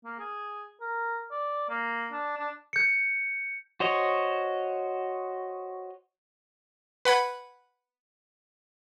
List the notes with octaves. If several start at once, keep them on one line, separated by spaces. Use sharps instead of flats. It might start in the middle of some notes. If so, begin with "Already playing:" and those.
A#3
G#4
A#4
D5
A#3
D4
D4
G6 C#7
F#4 C5 C#5 D#5
B4 F#5 B5 G#6